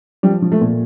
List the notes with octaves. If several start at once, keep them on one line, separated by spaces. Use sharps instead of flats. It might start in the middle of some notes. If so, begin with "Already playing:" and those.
F3 G3
F3
A3
A#2